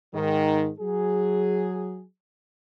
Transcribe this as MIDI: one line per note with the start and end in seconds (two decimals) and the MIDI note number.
0.13 0.69 44
0.13 0.69 51
0.79 2.02 54
0.79 2.02 68